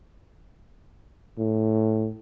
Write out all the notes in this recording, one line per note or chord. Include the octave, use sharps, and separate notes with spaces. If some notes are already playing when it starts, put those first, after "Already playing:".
A2